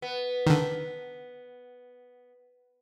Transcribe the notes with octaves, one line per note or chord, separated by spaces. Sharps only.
B3
D3 D#3